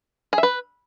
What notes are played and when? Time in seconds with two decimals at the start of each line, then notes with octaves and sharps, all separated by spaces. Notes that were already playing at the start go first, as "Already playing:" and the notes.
0.33 G#4
0.38 E5
0.43 B4